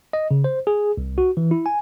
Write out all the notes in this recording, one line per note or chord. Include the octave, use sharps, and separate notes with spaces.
D#5
C#3
C5
G#4
C2
F#4
E3
E4
G#5